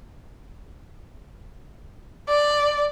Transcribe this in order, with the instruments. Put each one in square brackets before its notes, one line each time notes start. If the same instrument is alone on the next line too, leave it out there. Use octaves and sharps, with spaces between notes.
[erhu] D5